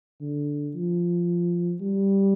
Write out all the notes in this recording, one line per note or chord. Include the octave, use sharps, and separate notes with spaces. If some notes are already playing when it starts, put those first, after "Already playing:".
D3
F3
G3